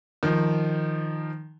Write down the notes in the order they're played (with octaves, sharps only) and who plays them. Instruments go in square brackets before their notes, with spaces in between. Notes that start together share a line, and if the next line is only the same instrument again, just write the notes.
[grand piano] D#3 F3